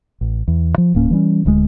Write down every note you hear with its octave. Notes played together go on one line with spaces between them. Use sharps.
A1
E2
F3
D1 A2 A#3 C#4
E3 G3 C#4
D1 D2 G3 G#3